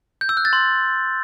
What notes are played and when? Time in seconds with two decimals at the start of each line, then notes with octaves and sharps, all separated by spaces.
0.21 G6
0.29 E6
0.37 F#6
0.45 A6
0.53 C6